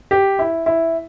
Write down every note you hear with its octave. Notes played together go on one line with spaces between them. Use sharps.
G4
E4
E4